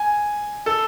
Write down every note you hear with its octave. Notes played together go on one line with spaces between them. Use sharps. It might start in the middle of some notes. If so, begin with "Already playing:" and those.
Already playing: G#5
A4